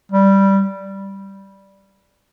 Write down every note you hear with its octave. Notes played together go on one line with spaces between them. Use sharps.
G3